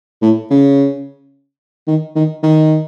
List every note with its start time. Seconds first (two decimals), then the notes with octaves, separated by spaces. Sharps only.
0.22 A2
0.51 C#3
1.87 D#3
2.16 D#3
2.43 D#3